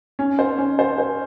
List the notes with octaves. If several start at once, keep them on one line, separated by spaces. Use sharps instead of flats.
C#4
C5
C#4
C5
C5